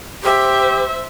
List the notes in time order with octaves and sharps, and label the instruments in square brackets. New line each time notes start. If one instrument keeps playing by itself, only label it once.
[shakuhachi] G4 [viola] C5 E5